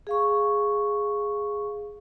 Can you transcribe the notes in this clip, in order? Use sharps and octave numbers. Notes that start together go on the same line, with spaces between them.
G#4 F5 C#6